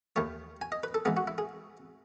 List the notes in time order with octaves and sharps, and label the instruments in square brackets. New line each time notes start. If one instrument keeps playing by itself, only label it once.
[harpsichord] D#2 D#3 A3 C#5
G#5
D#5
B4
A4
G#2 E3 G#3 B3 G#4
F#4
E4
G#4